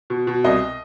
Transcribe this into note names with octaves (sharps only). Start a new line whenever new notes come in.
B2
B2
C2 D#5